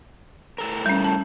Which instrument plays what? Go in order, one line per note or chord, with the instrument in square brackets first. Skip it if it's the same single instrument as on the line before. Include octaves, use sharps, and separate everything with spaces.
[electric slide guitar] A2 A4 A#4
[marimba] G3 C#4
A5